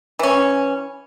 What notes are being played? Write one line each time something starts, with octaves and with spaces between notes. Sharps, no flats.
E3 C#4